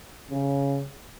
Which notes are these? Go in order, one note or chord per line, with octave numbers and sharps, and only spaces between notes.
C#3